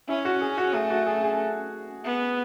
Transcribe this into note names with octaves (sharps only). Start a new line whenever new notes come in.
C#4 E4
F#4
G#4
F#4
A3 G#4
F#4
G#4
G#4
B3